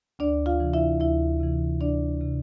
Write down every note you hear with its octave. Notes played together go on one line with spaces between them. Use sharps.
D2 D4 D5
F4 F5
C3 E3
E4 E5
D2 E4 E5
C3 E3
D2 D4 D5
C3 E3